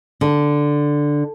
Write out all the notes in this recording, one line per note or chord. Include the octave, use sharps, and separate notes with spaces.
D3